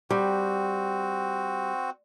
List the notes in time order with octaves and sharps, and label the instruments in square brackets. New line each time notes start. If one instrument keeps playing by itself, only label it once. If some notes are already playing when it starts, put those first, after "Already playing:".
[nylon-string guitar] G3 [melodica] C4 F#4